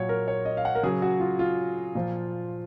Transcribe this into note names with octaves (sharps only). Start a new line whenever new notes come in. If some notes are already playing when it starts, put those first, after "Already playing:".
Already playing: A#2 F#3 C#5 F#5
A#4
C#5
D#5
F5
F#5
A#4
C#3 F#3 G#4
F#4
F4
F4
A#2 F3